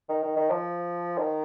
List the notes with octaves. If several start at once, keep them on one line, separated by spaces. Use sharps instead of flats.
D#3
D#3
D#3
F3
D#3